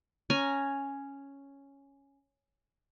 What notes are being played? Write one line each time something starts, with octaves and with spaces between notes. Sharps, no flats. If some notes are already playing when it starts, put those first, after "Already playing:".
C#4 G#5 A#5